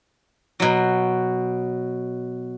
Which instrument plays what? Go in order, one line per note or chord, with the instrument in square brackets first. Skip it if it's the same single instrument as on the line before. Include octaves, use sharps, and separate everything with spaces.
[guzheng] B2 F#3